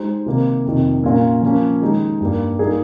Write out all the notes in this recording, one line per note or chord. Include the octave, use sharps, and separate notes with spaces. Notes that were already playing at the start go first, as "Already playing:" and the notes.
Already playing: G#3 D#4 G4 C5
C3 D#3 A#3
F2 C3 D#3
A#2 G3 C#4 F4 A#4
F3 A#3 C#4
D#3 G#3 D#4 G4
G2 G3 A#3
G3 A#3 D#4 G#4